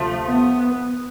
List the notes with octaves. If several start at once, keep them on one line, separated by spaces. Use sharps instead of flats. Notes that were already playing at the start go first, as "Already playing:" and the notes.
Already playing: D2 C3 F3 A3
B3